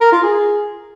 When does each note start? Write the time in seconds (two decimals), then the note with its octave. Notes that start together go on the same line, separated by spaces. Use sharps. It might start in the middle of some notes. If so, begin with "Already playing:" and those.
0.01 A#4
0.12 F4
0.24 G#4